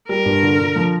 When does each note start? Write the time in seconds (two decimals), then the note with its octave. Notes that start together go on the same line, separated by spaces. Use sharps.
0.09 G3 A#4
0.25 G2
0.43 D3
0.60 D3
0.76 F3